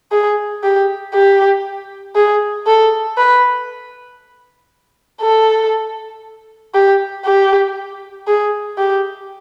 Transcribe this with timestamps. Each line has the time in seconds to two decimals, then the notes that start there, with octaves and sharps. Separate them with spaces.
0.11 G#4
0.64 G4
1.14 G4
2.16 G#4
2.66 A4
3.17 B4
5.21 A4
6.74 G4
7.25 G4
8.27 G#4
8.78 G4